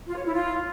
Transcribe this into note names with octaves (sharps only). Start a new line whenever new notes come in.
F4
C#5
E4
F4